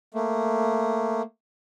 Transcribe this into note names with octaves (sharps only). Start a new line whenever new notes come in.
A3 A#3